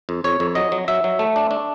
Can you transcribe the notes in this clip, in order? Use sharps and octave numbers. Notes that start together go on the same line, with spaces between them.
F2
F2 C#5
F2
F#3 D#5
F#3
F#3 E5
F#3
A3
D4
D4